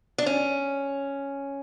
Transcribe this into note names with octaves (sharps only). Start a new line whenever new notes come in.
D4
C#4